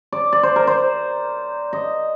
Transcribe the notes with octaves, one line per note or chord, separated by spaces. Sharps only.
D5
D5
C5
A#4
C5
D#5